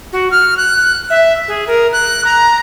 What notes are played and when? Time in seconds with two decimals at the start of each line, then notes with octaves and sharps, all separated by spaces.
0.13 F#4
0.31 F6
0.57 F#6
1.10 E5
1.48 G#4
1.67 A#4
1.93 F#6
2.25 A#5